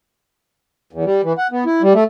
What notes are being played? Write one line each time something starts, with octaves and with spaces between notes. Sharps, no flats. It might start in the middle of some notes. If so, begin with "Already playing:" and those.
E2
G3
E3
F#5
B3
E4
G3
A3